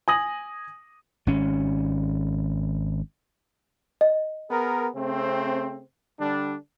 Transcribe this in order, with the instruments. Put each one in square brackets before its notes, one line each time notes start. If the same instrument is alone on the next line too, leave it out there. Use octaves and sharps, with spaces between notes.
[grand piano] G#5 D#6 A#6 F#7
[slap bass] G#1 C#4
[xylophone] D#5
[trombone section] B3 G#4 A#4
C#3 A3 C4
D3 G3 D4